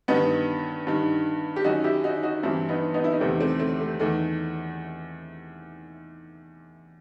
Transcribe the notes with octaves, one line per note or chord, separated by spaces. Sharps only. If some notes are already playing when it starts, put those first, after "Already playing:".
G2 D#3 B3 D#4
G2 D#3
G4
F#2 D#3 D#4 F#4
E4 G4
D#4 F#4
D#4 F#4
G2 E3 C4 E4
B3 D#4
B3 D#4
E4
D#4
E2 C3 D#3 A3 C4
A3 C4
A3 C4
A3
E2 D#3 A3